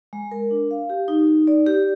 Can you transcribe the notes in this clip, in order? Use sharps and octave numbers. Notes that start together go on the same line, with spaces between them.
G#3
A#4
D4
F5
G4
D#4
D#4
D5
G4